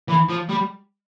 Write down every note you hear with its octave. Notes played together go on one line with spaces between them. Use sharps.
E3
F3
G3